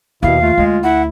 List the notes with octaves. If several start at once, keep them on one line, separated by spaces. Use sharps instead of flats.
D#2 B2 E4 F5
A3 F4
D2 G#3
E4 F#5